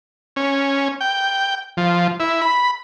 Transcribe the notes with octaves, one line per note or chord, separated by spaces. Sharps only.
C#4
G5
F3
E4
B5